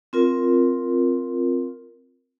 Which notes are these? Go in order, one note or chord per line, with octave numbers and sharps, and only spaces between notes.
C4 F4 A#4